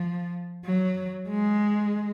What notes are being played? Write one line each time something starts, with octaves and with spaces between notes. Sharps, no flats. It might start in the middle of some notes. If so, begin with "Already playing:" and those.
Already playing: F3
F#3
G#3